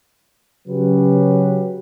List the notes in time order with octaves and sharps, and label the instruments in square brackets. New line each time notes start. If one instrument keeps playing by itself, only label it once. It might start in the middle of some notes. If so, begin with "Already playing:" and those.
[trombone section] C#3 F#3 C#4 G4 B4